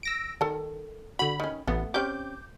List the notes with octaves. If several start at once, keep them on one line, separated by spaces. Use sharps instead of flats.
E6 A#6 D7
D#3 A4 A5
D3 F#4 B5
D#3 C#4
A1 A3 B3
C4 C#4 G4 D6 G6